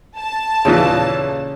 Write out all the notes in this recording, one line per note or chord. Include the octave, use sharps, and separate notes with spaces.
A5
D#2 A#2 C#3 E3